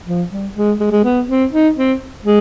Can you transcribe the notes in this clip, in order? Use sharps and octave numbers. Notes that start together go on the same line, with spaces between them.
F3
G3
G#3
G#3
G#3
B3
C4
D#4
C4
G#3